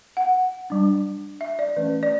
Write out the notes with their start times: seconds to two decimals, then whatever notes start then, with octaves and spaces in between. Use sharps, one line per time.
0.17 F#5
0.70 G3 D4
1.41 E5
1.59 D5
1.76 E3 A3 C#4 B4
2.03 D5